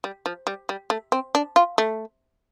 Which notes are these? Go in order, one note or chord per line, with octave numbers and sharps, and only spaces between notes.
G3
F3
G3
G3
A3
C4
D4
F4
A3